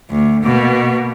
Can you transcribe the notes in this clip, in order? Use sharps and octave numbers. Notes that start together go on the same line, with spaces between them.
D2
B2 A#3